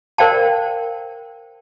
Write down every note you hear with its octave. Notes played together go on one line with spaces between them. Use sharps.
A#4 C5 D5 F5 G5 A5